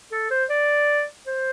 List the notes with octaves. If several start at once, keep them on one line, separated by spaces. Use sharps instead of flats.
A4
C5
D5
C5